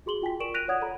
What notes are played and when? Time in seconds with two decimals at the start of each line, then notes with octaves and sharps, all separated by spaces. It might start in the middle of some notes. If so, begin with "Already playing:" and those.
0.06 F#4 G#4 C6 F#7 G7
0.22 F4 G5 G#5 B6
0.40 A#4 D5 C#6 D7 E7 F#7
0.54 F#6 A#6 B6 D7 D#7 F7
0.68 C#5 D5 F#5 D#6 G#6
0.82 A4 A#5 B5